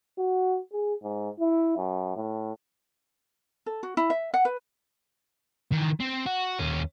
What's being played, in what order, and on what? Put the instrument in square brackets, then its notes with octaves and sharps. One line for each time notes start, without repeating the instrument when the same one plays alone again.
[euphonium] F#4
G#4
G#2
E4
F#2
A2
[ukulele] A4
F#4
E4
E5
F#5
B4
[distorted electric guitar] D#3 E3
C4
F#4
D#2 C#4